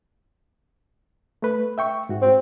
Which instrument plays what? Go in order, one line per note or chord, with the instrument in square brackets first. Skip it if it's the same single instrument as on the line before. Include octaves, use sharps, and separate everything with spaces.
[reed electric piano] A3 B4
E5 G5 C#6
G#2 F#4
[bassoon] C4